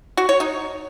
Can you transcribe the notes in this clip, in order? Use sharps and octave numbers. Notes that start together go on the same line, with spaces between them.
F#4
C#5
D#4